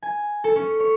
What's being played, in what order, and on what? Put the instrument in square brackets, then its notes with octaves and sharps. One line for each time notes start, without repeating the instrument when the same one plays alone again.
[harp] G#5
A4
C#4
C#5